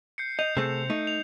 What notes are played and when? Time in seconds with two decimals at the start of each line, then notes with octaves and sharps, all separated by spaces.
0.18 G6 C7 C#7
0.39 D#5 G6 F7
0.57 C3 A3 C4 G#4 A4
0.90 A3 D#4
1.07 F7